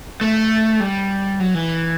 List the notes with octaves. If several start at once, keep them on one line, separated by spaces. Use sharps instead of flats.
A3
G3
F#3
E3